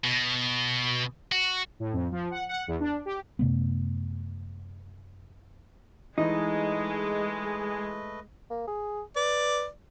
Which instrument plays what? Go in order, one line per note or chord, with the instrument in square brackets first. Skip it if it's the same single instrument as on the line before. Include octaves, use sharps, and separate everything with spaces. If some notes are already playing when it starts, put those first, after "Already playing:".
[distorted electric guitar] B2
F#4
[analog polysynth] A2
F2
F3
F#5
F#5
E2
D4
G4
[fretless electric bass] F#2 C3 A3 B3
[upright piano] E3 [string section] G#3 [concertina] A3 B4 D#5 [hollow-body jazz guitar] D#4
[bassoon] A#3
G#4
[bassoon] B4 [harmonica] D5